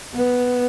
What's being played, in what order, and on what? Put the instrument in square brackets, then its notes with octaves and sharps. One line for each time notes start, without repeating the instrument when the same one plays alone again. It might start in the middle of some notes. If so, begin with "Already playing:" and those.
[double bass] B3